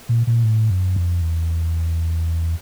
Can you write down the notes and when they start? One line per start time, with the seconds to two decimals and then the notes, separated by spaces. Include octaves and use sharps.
0.09 A#2
0.27 A#2
0.44 A2
0.70 F#2
0.96 F2
1.21 E2